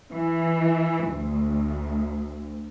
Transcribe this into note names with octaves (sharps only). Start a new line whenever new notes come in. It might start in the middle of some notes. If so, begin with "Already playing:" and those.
E3
D2